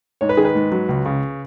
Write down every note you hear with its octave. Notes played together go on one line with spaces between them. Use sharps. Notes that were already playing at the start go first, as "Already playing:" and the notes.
G#2 C#5
B4
D#3 G#4
B4
G#2
F#3
C#2
C#3